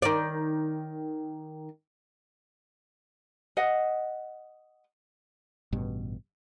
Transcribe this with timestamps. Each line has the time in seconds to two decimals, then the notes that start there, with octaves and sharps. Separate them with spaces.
0.02 D#3 D5
3.57 D#5 F#5
5.72 A1 G2 B2